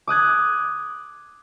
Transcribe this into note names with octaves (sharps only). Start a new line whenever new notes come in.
D6 D#6 F#6 G#6